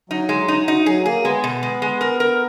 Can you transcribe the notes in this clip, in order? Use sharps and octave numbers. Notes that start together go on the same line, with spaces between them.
F#3 D#4
G#3
D#4
F#3 D#4
F#3 G#4
A#3 G#4
G#3 B3
B2
G#3
G#3
A#4
A#4